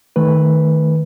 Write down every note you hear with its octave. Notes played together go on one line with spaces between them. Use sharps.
D#3 A3 B4